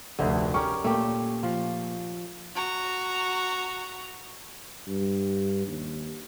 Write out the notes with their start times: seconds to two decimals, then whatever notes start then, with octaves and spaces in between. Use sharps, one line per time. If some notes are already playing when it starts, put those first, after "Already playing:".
0.19 F1 D2 D3
0.54 C#4 G4 A#4 C#6
0.84 A#2 A3 G4
1.43 F3
2.55 F#4 A#5
4.87 G2
5.67 D#2